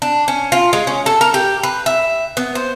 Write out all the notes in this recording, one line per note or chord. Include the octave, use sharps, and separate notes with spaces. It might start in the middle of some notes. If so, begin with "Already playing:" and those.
D4
C#4
F4
G#3
C#4
A4
A#4
G4
B4
E5
B3
C5